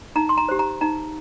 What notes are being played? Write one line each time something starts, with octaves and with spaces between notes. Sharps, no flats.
D#4 A#5
C6
A#5
G4 C5
A#5
D#4 A#5